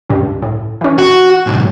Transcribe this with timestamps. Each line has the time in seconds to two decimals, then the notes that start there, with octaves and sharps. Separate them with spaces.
0.10 C#2 G2
0.42 A2
0.81 E3 C#4
0.98 F#4
1.47 B1 G#2